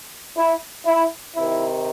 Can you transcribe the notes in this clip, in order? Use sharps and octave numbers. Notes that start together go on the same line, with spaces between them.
E4
E4
C3 D#3 E4